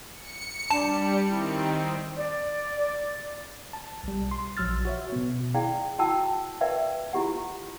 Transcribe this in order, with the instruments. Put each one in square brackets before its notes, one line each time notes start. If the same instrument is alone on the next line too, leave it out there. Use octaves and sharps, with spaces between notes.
[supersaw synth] C#7
[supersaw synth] G3 [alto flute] D4 [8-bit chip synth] A5
[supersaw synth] D#3 C4 [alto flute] E4
[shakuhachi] D5
[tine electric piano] A5
B1 G3
C6
A#1 F#3 E6 F6 A6
F#4 C#5 E5
B2 B3
[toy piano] E4 G#4 D5 F5 G5
E4 F#4 F#5 G5 A5 E6
A#4 B4 D5 E5 F5 G5
E4 F4 G4 F#5